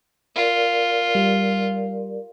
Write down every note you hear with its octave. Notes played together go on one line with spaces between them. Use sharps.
F4 A#4 D5
G3